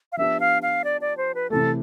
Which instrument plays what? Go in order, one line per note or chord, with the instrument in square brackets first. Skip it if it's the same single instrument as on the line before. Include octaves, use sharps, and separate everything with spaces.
[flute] F5
[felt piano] F3 B3 D4 G4 [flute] E5
[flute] F5
F5
D5
D5
C5
B4
[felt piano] C3 E3 A3 [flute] A4